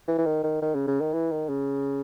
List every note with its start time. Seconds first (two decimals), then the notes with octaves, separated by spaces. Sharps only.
0.08 E3
0.18 E3
0.26 D#3
0.43 D#3
0.61 D#3
0.75 C#3
0.87 C#3
1.01 D#3
1.13 E3
1.31 D#3
1.49 C#3